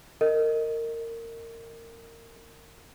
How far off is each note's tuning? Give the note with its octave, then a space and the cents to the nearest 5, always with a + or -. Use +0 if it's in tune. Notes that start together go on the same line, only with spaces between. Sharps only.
A#4 -25 D#5 +5